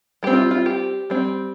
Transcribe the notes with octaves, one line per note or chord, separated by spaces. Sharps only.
G3 C4 G4
F4
F4
G4
G3 C4